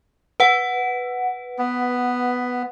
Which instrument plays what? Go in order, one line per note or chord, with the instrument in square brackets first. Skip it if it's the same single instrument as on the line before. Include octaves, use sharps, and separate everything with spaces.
[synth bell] B4 F#5
[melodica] B3